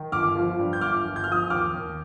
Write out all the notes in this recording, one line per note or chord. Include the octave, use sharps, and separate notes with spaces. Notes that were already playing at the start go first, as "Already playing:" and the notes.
Already playing: D#3
G1 D6 F6
F3
G2
G6
G1 D6 F6
G1
G6
F6
F3 D#6 G6
D#2 D6 F6
D#2